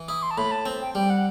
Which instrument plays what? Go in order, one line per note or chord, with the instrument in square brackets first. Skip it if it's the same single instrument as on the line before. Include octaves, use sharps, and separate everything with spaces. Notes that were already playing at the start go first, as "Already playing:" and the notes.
Already playing: [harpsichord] E3
[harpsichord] E4 [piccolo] D#6
[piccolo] C6
A5
[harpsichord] A2 [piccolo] B5
[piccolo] A5
[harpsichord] C4
[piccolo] G5
[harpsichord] G3 [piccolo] G5
[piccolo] F#5